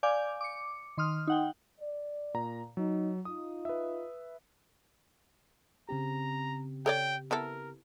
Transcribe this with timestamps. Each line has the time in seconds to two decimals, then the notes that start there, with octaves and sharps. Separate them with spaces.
0.03 D5 F5 G#5 D6 G6
0.41 D6 C#7
0.97 D#3 C6 D#6 F6
1.27 D#4 F#5 G5
1.79 D5
2.34 A#2 A#5
2.77 F#3 D#4
3.25 D#4 F4 D#6
3.65 B4 E5
5.89 C#3 C4 G4 A#5
6.86 A4 C#5 D5 G5
7.31 B3 E4 A4 A#4